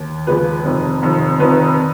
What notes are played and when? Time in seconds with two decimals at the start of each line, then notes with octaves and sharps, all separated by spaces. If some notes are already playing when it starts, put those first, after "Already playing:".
Already playing: D#2
0.27 D#2 C#3 F3 G#3 B4
0.65 F1 F2 D#3
1.02 F1 F2 D#3
1.39 F1 F2 D#3 B4